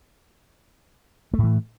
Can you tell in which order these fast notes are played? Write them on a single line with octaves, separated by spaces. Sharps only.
A3 A2 E3